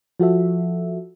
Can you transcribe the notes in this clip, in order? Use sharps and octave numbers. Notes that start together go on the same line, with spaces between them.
F3 F#4 A4 E5